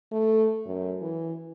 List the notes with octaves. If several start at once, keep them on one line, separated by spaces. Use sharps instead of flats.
A3
F#2
E3